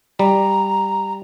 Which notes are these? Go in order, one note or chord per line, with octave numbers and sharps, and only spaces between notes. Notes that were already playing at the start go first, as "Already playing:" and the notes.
G3 A#5